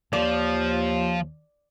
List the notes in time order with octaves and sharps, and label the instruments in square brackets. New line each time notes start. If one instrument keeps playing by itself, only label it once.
[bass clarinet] D#2 [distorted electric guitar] F3 [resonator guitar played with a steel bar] D5